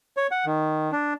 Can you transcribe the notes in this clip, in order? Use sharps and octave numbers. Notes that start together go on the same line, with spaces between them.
C#5
F#5
D#3
D4